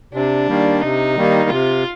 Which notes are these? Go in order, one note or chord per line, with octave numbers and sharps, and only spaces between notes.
C3 D4
D#3 G3 A#3
C3 D#4
D#3 G3 A#3
C3 F4